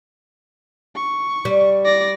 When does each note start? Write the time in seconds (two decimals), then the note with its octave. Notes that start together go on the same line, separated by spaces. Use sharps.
0.96 C#6
1.45 G3
1.85 D5 A#6